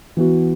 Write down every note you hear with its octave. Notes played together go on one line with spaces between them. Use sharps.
E3 B3 F#4